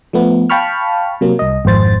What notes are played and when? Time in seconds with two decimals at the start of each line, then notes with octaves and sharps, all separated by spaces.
0.13 F3 A3 B3
0.50 F5 G5 A5 B5 C#6 F6
1.21 C3 F#3 A#3
1.39 C2 D#5
1.65 G#1 F2 C5 A6